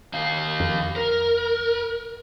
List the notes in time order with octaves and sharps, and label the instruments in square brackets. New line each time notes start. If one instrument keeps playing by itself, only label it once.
[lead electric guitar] D#3 F5
[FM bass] F2
[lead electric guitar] A#4